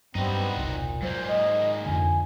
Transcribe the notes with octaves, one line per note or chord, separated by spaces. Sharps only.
G2 F#3 G3 B3 C4 D#4 F#4
E1 C2 A#2
G#2 F#3 A#3 C5
D#5
F2 D3 G#5